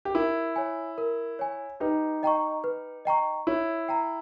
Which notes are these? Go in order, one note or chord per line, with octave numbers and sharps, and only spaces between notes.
G4
E4 A#4
C#5 G#5
A#4
C#5 G#5
D#4 G4 B4
D#5 G5 A#5 C#6
B4
D#5 G5 A#5 C#6
E4 C#5
G5 A#5